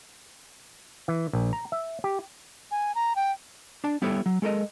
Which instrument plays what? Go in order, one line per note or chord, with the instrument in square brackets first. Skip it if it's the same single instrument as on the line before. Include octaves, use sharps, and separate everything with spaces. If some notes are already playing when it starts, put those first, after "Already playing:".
[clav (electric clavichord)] E3
A#1
A#5
E5
G4
[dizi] G#5
A#5
G5
[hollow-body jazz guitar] D4 A5
G3 B3 E4 G4 A4 C#5
F#3
G#3 A4 A#4 D#5